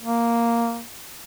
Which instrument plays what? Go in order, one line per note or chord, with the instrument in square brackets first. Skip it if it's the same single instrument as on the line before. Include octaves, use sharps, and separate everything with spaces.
[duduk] A#3